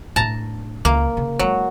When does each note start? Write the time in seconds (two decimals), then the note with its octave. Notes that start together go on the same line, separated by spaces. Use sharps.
0.16 A2 D4 A5 A#5
0.85 C#2 A#3
1.17 C#3
1.39 F#3 G#3 E4